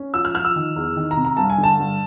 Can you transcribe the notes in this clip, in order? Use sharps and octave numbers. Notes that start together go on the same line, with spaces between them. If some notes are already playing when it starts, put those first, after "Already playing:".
Already playing: C#4
F3 E6
F6
F3 F6
E6
D#3
E2
D#3
A#5
C3
A#5
G2 A5
G#5
D3
A5
G2